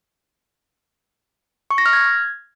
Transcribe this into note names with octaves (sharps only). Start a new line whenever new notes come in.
C#6
A#6
F6
G#6